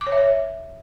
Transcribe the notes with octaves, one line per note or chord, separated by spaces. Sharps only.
D6
C#5
E5
C#5